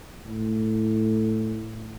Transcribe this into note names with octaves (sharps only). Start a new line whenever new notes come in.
A2